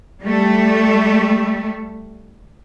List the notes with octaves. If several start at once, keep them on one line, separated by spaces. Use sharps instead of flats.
G3 A3